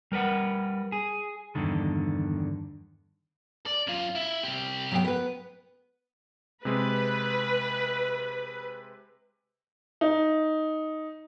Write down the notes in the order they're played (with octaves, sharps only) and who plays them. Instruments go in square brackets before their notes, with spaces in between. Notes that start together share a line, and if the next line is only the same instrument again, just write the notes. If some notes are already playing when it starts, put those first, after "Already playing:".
[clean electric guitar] G3 A#4 B4 F#5
G#4
E2 G2 D3 D#3
[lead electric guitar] D5
F#2 F4
E4
C2 G4
[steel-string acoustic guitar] F#3 B3 G5
B3 B4
[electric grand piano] C3 G#3 [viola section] B4
[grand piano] D#4